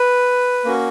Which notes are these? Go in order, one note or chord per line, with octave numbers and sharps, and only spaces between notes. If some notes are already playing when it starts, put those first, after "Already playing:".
Already playing: B4
A#3 C#4 F#4